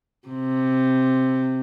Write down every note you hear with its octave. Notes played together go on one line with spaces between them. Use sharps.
C3